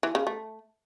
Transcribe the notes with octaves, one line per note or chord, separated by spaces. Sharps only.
E3
C#3
A3